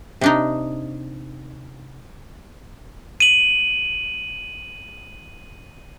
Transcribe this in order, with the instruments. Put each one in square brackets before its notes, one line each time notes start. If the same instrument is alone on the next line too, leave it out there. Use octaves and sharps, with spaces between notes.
[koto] C3 D4 D#4
[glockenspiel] D#7 F#7